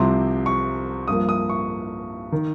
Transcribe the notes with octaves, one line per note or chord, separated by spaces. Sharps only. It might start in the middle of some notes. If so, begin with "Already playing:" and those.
Already playing: C2 C3 F3 C4 C6
C#6
G2 F3 A#3 D#6
D#6
C#6
D#3